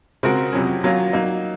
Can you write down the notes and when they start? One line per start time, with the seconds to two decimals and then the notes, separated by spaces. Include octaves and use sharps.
0.23 C#3 G#3 C4 F#4 A#4
0.53 F2 C3 F#3 C#4
0.84 F#3 A#3 C#4 F4
1.13 F#3 A#3 D#4